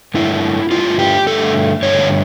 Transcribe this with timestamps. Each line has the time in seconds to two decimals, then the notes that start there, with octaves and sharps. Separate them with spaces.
0.14 G2 D3 A3 E4
0.71 G2 D3 A3 F4
0.99 G4
1.26 G2 D3 A3 A4
1.83 G2 D3 A3 C#5